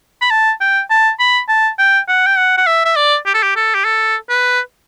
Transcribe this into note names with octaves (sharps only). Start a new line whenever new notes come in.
B5
A5
G5
A5
B5
A5
G5
F#5
G5
F#5
F#5
E5
E5
D5
G4
A4
G4
A4
G4
A4
B4